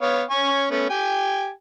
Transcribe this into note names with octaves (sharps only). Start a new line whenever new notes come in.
B3 C#5 F5
C#4 G#5 C#6
A3 B3 C#4
G4 G5 G#5